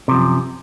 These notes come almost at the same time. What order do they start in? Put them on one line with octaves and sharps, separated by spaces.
C3 F3 F#2